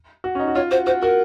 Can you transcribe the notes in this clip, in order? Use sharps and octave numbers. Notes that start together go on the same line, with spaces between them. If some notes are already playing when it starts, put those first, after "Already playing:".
F#4
C#4
D#4
F#4
F4 C#5
F#4 C5
F#4 C5
F#4 A#4